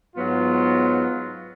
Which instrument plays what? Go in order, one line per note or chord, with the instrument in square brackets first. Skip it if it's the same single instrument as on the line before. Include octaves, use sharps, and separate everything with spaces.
[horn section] G#2 F#3 B3 F4